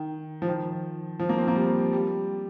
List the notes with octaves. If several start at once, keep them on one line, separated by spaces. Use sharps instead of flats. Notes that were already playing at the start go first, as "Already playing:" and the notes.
Already playing: D#3
F3
D#3
F3
A#3
C4
A#3
G3
G3